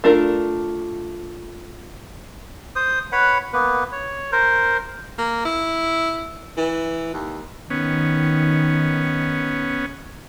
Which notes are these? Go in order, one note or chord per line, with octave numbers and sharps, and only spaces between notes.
A3 D4 F4 A#4
C5 D#6
B4 C#5 F#5 B5
A#3 B3 B4
C#5
A#4 C5
A#3
E4
E3
D#2
D#3 B3 C#4